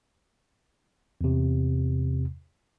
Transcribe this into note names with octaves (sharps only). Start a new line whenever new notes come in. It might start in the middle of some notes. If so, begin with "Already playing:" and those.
E2 C3